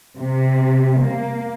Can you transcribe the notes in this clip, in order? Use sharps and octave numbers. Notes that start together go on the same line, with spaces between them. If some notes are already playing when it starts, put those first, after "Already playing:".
C3
A#3